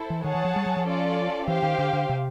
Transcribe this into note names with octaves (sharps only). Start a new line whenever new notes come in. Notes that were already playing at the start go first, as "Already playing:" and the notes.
Already playing: E4 A4 C5
E3
D#3 G#4 C#5 F#5 A5
E3
F3
G3
F#3
F3
C#4 F4 A4 D5
E3 G4 C5 F5
D#3
D3
D3
C3